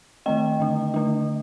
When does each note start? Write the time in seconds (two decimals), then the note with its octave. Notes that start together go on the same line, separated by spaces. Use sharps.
0.26 D#3 A3 C4 D#5 G5
0.60 D3 A3 D4
0.94 D3 A3 D4